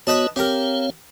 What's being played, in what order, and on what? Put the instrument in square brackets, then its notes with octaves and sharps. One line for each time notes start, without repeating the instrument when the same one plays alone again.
[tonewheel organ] B3 F#4 C#5 [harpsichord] B4 D#5 A5
[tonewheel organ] C4 C#5 F5 [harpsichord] G4 A#4